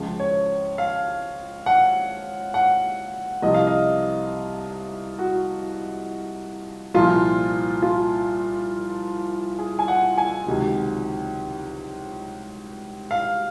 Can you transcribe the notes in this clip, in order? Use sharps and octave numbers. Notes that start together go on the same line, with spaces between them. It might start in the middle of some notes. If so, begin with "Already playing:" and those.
Already playing: C#2 C#3 F3
C#5
F5
F#5
F#5
C2 C3 F3 D#5
F5
D#5
F#4
C2 A#2 F3 F4
F4
G#4
G#5
F#5
G#5
C#2 C3 D#3 F#3
F5